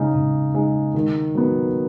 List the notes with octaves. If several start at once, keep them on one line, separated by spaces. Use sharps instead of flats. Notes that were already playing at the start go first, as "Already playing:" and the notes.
Already playing: C#3 G#3 D#4
C#3
G#3 D#4
D#3
F#3 B3